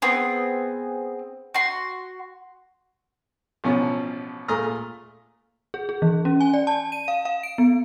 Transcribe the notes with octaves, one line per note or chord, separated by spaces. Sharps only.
B3 C4 G#4
F#4 C6
A1 B2 F3 C#4
A#2 A3 G#4 A#5 D#6 F6
G#4
G#4
E3
C#4
G#5
D5
A5
D#7
F5
F5
D7
B3